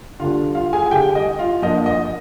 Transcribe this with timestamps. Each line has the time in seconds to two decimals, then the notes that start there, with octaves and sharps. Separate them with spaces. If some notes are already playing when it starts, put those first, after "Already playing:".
0.20 D3 G3 D4 F4 F5
0.55 F4 F5
0.73 G#4 G#5
0.86 G#5
0.91 D3 G3 D4 G4 G5
1.15 D#5
1.39 F4 F5
1.62 F3 A#3 D4 D#5
1.86 D#5